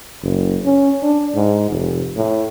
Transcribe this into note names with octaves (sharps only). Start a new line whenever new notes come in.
F#1
C#4
D4
G#2
F1
A2